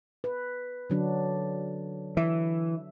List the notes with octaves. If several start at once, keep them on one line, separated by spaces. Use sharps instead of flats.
B4
D3 F#3 D4
E3 E5